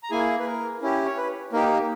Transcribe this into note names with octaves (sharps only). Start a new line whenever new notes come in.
A#5
A#3 E4 G#4 G#5
B4
A#4
C#4 E4 G4
C#5
B4
A#3 D#4 G4 A#4